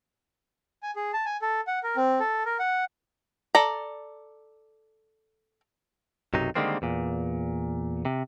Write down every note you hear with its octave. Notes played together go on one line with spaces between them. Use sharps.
G#5
G#4
A5
G#5
A4
F#5
A#4
C4
A4
A#4
F#5
A4 D5 A#5
B1 F#2 C3 F#3 D#4
D3 D#3 G3 G#3 A#3 C4
E2 A#2
C3